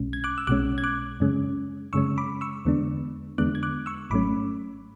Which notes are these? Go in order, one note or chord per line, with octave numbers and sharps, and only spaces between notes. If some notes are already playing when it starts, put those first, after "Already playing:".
Already playing: B1 B2 G#3 C#4
G#6
D6 F#6
E6
B1 B2 G#3 C#4 D6 F#6
G#6
D6 F#6
F#2 C#3 G#3 C#4
F#2 C#3 G#3 C#4 C#6 E6
B5 D6
C#6 E6
E2 D3 G#3 B3 D4
E2 D3 G#3 B3 D4 D6 F#6
G#6
D6 F#6
C#6 E6
G#1 G#2 F#3 A3 C#4 B5 D6